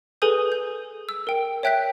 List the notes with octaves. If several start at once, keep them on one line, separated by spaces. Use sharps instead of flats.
G#4 A4 B4 G#5 D#6 G6
G6
E6
A#4 G5
C#5 E5 G5 F#6 G6 B6